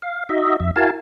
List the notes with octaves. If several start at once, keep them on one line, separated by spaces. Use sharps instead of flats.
F5
D#4 F#4 D#5 E5
F2 E5
E4 F#4 A#4 F5 G#5 A5